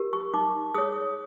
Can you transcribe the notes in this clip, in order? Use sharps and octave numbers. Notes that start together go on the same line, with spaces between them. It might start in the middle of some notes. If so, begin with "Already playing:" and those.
Already playing: G4 A#4
C#6
D#4 D6
G#4 C#5 D#6